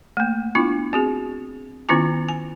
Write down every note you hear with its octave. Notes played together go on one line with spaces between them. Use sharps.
A3 A#3
B3 D4 E4 F4
C4 F#4 G#4
D#3 B3 C#4 E4 F4 G#5
G#5